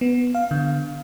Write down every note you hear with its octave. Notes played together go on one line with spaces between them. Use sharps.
B3
F5
D3